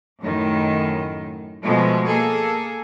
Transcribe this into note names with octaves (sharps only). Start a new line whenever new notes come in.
F#2 A2 D#3
B2 F3 G#3 A3
A#3 G#4 A4